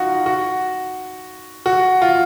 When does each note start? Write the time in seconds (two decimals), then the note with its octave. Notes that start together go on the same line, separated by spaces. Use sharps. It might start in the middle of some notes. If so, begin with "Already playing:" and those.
Already playing: D#4 F4 F#4
0.26 F#4
1.66 F#4
2.02 F4